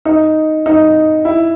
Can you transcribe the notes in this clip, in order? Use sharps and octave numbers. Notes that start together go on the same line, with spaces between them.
D#4
D#4
E4